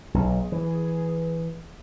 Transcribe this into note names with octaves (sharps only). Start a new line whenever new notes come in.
B1 G#4
E3